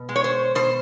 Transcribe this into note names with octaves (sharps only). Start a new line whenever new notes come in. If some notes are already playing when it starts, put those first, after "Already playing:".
Already playing: B2
G#3
C#5
C5
B2 C5